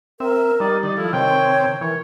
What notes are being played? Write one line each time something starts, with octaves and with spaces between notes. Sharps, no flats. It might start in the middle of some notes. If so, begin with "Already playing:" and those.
C4 A#4 E5
G3 D#4 D5
D#3 D5
F3 E4 A4
C3 D#3 C#5 G5
E3 A#4 C#5